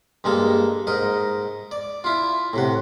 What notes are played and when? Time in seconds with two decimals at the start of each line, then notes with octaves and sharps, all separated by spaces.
0.24 G2 G#3 A#3 A4
0.87 G#2 A#4 D#5
1.71 D5
2.04 E4 F4
2.53 A2 C3 F#5